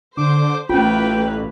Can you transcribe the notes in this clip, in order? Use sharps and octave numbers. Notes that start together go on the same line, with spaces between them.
D3 C5 D6
A1 A3 A#3 C#4 F4 B4 G5